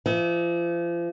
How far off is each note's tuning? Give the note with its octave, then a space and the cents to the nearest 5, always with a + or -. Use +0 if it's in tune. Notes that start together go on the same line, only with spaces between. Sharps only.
F3 -35 D#5 +45